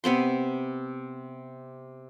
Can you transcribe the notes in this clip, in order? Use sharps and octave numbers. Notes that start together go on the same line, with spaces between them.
C3 B3 C4 C6